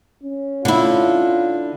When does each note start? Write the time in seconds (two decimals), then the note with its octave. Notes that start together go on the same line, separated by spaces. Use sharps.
0.23 C#4
0.65 D3 E4 F4